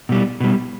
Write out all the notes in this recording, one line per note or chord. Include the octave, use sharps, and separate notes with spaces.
B2 G3
B2 G3